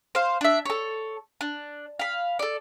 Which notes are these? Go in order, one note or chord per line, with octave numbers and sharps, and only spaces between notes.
C5 F5
D4 E5
A4 C#5
D4
F5 B5
A4 D5